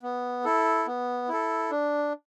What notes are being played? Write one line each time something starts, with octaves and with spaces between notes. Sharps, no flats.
B3
E4 A4
B3
E4 A4
D4